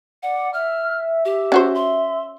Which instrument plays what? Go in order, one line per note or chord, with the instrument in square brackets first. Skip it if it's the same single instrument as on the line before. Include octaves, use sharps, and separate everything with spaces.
[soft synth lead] D5 [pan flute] F#5
[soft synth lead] E5 [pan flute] F6
[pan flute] G4 [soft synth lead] E5
[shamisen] C#4 F#4 C5
[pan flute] C6